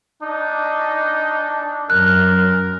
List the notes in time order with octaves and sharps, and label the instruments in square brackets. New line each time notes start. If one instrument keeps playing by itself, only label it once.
[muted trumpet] D4 [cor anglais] D#4
[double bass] F#2 F#3 [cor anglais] A#4 [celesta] F#6